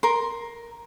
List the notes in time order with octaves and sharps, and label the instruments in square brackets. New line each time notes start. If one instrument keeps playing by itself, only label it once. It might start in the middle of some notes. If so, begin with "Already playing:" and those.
[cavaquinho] A#4 C6